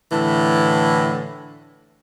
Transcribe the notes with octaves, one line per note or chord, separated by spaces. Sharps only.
A2 D3 E3